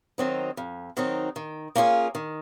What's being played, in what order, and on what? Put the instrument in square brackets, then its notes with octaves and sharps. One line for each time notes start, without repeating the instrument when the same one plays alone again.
[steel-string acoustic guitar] D#3 F#3 C4 D#4
F2
D#3 F#3 C4 D#4
D#3
A#3 C#4 F4 G#4
D#3